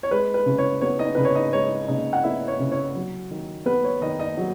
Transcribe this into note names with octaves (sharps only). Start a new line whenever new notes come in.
C#5
G#3 B4
B4
C#3
C#5
B3 C#5
D#4 D#5
C#3 B4
C#5
D#4 D#5
G#3 C#5
C#3 D#4 D#5
F#5
B3 E4 E5
C#5
C#3
C#5
F#3
D#3
B3 B4
C#5
D#3 D#4 D#5
D#4 D#5
F#3